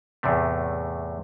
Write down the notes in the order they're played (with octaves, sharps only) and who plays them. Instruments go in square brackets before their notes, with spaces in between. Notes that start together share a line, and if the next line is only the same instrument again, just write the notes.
[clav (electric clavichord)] E2 A2 C3 A3